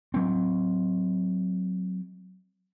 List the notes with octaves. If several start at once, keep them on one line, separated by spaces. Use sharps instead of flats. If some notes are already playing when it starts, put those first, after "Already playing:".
F#3 C4